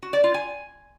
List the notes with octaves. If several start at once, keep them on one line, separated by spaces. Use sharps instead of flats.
F#4
D5
F4
G#5